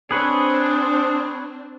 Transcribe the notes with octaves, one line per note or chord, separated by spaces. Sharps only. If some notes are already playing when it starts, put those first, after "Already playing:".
C4 D4 G#4 B4 C#5